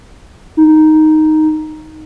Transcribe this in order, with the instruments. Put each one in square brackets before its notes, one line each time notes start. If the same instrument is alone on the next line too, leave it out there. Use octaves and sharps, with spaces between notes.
[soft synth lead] D#4